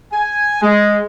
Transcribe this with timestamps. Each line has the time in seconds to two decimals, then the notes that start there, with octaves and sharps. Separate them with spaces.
0.13 G#5
0.62 G#3